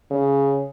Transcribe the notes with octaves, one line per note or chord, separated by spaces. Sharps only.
C#3